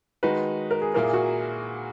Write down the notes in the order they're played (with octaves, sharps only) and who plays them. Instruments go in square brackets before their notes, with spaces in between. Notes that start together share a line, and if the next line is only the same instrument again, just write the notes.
[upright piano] D#3 G#3 D#4 F#4 [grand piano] B4
[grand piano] A#4
G#4
[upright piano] A#2 A#3 E4 [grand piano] A#4
[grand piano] G#4
F#4